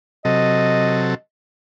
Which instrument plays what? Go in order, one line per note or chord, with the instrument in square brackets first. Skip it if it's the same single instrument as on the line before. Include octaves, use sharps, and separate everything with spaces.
[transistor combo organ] C3 F#3 A4 [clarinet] D#5